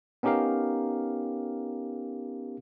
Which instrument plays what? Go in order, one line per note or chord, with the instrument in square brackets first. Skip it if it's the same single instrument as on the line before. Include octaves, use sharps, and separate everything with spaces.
[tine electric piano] B3 C#4 D#4 G4 A#4 F5